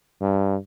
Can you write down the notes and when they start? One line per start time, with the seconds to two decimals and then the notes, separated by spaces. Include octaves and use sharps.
0.21 G2